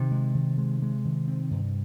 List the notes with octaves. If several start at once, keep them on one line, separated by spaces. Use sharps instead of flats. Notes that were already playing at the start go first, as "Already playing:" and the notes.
Already playing: C3 D#3
G#3
D#3
G#3
G#3
D#3
C4
G2